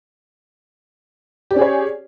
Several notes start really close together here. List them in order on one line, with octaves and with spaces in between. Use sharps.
G4 D5 C#4 G#4 C#5